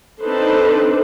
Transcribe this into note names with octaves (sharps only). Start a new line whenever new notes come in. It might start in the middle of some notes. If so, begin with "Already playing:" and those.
C4 D4 D#4 A4 B4 C5